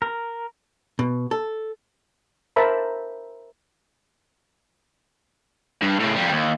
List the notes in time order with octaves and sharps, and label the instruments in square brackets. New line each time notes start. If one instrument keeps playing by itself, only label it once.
[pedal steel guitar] A#4
[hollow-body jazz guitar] B2
A4
[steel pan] A#4 C5 E5 A5 B5
[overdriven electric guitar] G2
A2 C#3
F2 G3
D#2